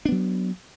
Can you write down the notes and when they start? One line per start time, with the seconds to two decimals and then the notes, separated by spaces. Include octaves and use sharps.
0.05 D4
0.09 B3
0.12 F#3